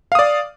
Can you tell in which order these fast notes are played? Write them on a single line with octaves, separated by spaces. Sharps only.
F5 D#6 D5